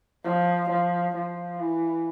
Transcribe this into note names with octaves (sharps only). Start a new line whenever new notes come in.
F3
F3
F3
E3